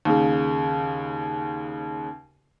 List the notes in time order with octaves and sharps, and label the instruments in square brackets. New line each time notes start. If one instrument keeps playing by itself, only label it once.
[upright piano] D#2 C#3